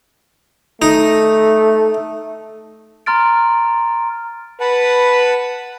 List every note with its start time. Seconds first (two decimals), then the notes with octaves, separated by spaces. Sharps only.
0.82 A3 D#4
3.06 A#5 C6 F6 A6 D7
4.60 B4 F#5 A5 B5